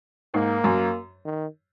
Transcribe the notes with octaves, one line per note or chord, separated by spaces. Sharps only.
G#2 A#3
F#2
D#3